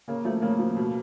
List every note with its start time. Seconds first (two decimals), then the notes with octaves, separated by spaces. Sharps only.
0.08 C#3 A#3
0.25 F3 A3
0.42 C#3 A#3
0.59 F3
0.76 B2